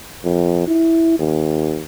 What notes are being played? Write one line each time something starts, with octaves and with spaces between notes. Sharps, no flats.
F2
E4
D#2